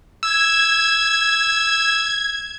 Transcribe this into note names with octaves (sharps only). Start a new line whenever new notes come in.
E6 G#6